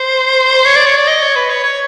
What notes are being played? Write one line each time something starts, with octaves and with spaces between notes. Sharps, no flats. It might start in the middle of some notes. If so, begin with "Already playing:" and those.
Already playing: C5
C#5
D5
C#5
D5
D#5
C#5
B4
C#5
C#5